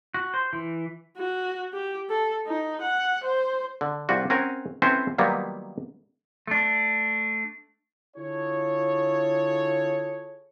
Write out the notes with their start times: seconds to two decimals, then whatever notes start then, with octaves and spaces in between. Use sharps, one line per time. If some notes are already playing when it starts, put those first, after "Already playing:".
0.14 F#4
0.34 C5
0.53 E3
1.17 F#4
1.73 G4
2.10 A4
2.47 D#4
2.82 F#5
3.24 C5
3.81 D3
4.09 C2 G3 F4 F#4
4.30 C4 C#4 A#4 F#5 G#5
4.82 C4 C#4 E4 A4 B4 C5
5.18 D#3 F#3 G3 A#3 B3 F4
6.47 A3 D4
8.17 D3 E4 F4 G#4 A4 C#5